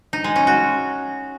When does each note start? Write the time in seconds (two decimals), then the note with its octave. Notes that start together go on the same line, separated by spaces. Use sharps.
0.13 D#4
0.24 G#3
0.36 C#4
0.47 F#4